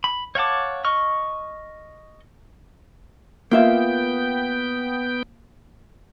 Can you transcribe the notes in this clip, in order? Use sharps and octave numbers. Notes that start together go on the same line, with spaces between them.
B5
C#5 F5 F#5 A5 D6
D#5 C#6 F6
A#3 B3 F4 E5 G5